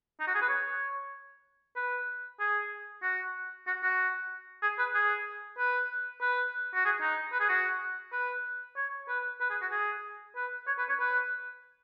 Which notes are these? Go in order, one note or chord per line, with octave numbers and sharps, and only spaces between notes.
D#4
F#4
G#4
B4
C#5
B4
G#4
F#4
F#4
F#4
G#4
B4
G#4
B4
B4
F#4
G#4
D#4
B4
G#4
F#4
B4
C#5
B4
B4
G#4
F#4
G#4
B4
C#5
B4
C#5
B4